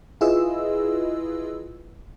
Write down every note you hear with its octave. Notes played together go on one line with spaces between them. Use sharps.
E4 F4 G#4 B4 D#5 E6